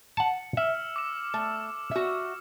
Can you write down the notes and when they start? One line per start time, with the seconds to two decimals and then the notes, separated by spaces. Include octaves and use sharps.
0.17 F#5 A5 C#7
0.57 E5 E6 F6 E7
0.96 D6 E7
1.34 A3
1.91 F#4 E5